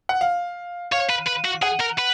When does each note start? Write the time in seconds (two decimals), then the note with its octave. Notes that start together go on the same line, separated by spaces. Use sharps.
0.09 F#5
0.21 F5
0.92 C#5 F5
1.10 B4
1.27 B4
1.45 F#4
1.62 G#4 F#5
1.80 A#4
1.99 B4